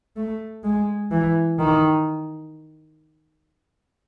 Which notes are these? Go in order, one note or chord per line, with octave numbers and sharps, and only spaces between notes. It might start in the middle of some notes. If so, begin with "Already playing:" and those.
A3
G#3
E3
D#3